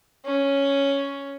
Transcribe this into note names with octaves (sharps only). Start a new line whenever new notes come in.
C#4